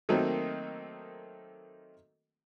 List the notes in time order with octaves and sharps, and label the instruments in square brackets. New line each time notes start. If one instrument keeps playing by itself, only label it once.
[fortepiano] D#3 F#3 A3 A#3 C4 D#4